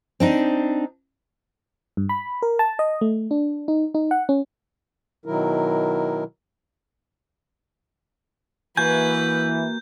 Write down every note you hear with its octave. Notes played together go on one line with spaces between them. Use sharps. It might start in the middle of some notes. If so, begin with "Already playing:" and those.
C4 D4 D#4
G2
B5
A#4
A5
D#5
A3
D4
D#4
D#4
F#5
C#4
B2 D#3 F#3 E4 A#4
E3 A#3 F#4 B4 G#5 G6